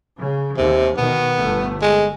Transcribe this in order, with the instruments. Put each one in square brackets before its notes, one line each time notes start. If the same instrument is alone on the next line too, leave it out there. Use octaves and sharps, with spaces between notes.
[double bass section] C#3
[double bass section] D#2 [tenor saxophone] C3
[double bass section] B2 D#3 [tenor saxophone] B3
[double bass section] G1 A3
[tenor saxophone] G#3